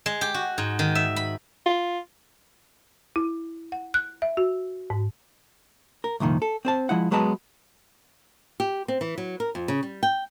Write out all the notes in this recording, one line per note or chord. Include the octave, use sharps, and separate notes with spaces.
G#3
G4
F#4
G#2
D#3
E5
B5
F4
E4
F#5
F#6
E5
F#4
G#2
A#4
C2 F2 A#2 D#3
A4
C4 C5 A5
F3 G#3 E4 F#5
F#3 G#3 B3 B4 A5 A#5
G4
C4
E3
F#3
A#4
F2
C#3
G3
G5